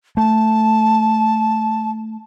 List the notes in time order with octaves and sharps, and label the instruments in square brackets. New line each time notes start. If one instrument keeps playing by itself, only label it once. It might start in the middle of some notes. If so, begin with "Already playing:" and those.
[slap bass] A3 [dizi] A5